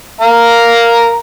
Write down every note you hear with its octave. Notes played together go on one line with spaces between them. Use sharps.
A#4 F5 A#5